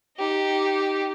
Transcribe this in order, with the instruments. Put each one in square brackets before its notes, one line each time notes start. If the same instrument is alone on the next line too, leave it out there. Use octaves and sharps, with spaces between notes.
[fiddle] D#4 G4